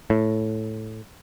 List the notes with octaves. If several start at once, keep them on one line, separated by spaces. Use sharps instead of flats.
A2